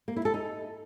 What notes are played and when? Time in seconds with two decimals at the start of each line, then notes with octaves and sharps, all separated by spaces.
0.08 A#3
0.16 E4
0.25 A4
0.34 D#4